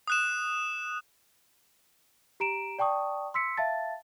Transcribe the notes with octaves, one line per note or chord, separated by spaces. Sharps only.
D#6 F#6 E7
G4 A#5 D7 E7
D5 G5 A5 C#6 D#6
C6 E6 B6 C#7
E5 F5 A5 A6